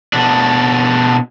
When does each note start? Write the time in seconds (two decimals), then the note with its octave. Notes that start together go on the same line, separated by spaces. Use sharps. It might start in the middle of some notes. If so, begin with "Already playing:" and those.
0.13 B2 D4